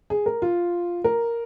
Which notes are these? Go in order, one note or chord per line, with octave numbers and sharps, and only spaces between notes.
G#4
A#4
F4
A#4